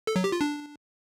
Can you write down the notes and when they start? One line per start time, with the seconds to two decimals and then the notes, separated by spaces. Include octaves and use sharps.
0.07 A4
0.16 F#3
0.24 G4
0.32 F4
0.41 D4